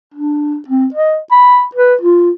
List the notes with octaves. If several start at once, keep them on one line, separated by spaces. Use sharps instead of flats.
D4
C4
D#5
B5
B4
F4